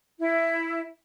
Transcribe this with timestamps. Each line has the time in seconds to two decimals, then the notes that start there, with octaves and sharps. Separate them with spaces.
0.19 E4